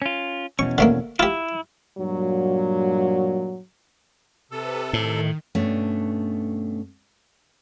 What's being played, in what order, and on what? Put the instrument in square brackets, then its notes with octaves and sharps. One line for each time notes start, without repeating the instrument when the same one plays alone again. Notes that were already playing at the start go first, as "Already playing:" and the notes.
[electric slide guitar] C#4 F4
[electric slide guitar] E2 B2 C#4 [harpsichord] C#6
[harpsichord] D3 A3 A#3
[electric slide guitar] E4 [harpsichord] F4 G4
[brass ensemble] G2 A#2 F#3
[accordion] C3 A4 [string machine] B4
[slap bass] A2 [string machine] D#3
[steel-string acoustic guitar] G2 B2 A3 C#4 D4